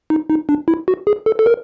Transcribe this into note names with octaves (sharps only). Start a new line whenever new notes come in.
D#4
D#4
D4
E4
F#4
G#4
A4
A4
A#4